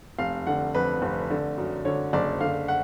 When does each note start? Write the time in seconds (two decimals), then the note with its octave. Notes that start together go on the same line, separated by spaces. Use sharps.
0.19 F1 F5
0.47 D3 F#5
0.74 F2 B4
1.02 F1
1.30 D3
1.58 F#2
1.85 D3 C#5
2.13 F#1 D5
2.41 D3 F5
2.68 F#5